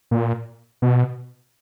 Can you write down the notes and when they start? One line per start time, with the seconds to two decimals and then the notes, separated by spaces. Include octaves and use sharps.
0.11 A#2
0.82 B2